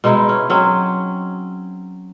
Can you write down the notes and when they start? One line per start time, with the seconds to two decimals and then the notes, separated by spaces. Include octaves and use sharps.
0.04 B2 G#3 D#4 E4
0.29 C#4
0.50 F#3 C4 C#4